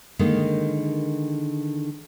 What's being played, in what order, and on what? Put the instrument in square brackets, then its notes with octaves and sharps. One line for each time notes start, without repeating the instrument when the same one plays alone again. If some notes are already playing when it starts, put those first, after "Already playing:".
[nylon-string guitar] D3 D#3 G#3 A#3 D#4